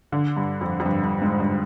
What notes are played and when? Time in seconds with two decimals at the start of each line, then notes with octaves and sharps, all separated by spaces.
0.12 D3
0.37 G2
0.61 F2
0.80 F2
0.86 G2
1.04 G2
1.22 G#2
1.40 G2